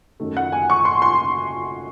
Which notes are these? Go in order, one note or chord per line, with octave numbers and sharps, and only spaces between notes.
F#2 D#3 A3
F#5
G#5
C#6
C6
C6